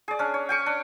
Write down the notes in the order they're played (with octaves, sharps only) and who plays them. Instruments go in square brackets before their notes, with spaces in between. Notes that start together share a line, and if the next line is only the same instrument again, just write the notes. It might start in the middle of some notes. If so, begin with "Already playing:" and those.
[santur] G#4 D5
C#4 D4
C#5
G5 G#5 C#6
D4